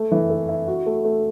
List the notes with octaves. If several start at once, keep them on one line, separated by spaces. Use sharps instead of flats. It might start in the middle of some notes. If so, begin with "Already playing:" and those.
Already playing: A3
E3
A4
E4
F#4
A3
A3